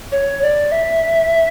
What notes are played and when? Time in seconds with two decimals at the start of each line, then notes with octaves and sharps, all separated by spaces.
0.12 C#5
0.42 D5
0.72 E5